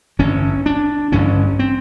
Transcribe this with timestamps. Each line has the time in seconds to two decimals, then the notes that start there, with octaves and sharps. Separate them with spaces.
0.19 A1 G2 D3 C#4
0.66 D4
1.12 A1 G2 D3 C#4
1.59 C4